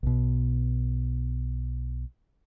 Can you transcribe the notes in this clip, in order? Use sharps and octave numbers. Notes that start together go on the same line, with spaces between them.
B1 B2